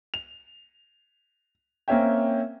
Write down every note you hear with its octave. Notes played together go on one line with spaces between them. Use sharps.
F7
A#3 C4 C#4 C#5 E5 G5